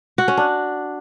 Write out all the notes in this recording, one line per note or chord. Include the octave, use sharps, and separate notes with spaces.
F#4
C#4
D4